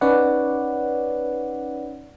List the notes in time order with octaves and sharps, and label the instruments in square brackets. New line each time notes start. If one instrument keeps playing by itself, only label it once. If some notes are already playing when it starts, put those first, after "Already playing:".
[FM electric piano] C#4 D#4 B4 C#5 D5 F#5